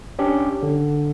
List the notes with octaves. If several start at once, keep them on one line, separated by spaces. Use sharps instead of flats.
C#4 D4 G4
D3